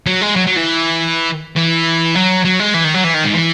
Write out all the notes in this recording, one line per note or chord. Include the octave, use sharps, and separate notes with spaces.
F#3
G#3
F#3
F#3
E3
E3
F#3
F#3
G#3
E3
D#3
F#3
E3
D#3
G#2
E3